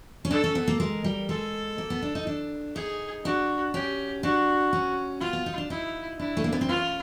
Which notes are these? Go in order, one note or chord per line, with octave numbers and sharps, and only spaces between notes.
C#4
D4 A4
C#4
B3
A#3
G#3 A#4
G3
G#3 A4
A#3
B3
D4
D#4
D4
D#4 G#4
D4 F#4
C#4 G4
D4 F#4
C#4
B3 F4
B3
D#4
D4
D#4 E4
D4 E4
A3
A#3
B3
C4
C#4 F4